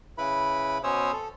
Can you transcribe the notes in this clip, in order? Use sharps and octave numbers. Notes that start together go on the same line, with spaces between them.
C#3 E4 B4 B5
B2 C#4 C5 C#5 D#6 E6
A4